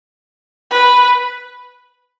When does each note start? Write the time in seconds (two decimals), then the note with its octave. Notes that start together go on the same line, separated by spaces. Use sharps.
0.70 B4